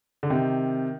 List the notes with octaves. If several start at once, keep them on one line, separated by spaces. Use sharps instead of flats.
D3
C3 D#3